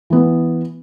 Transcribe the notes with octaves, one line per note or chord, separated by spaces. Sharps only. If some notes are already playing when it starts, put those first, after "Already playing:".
E3 B3